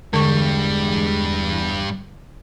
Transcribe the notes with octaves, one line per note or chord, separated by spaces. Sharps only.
E2 G2 D3 G3 G#3 C#6